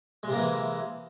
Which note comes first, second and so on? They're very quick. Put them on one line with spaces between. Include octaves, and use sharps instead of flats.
G#3 C3 A#3 E3